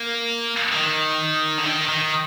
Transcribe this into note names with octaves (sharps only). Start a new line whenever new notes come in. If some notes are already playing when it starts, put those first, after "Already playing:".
Already playing: A#3
D#3
D3
D#3
D#3